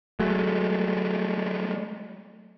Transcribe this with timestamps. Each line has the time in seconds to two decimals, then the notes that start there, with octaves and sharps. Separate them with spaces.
0.20 F#3 G#3 A3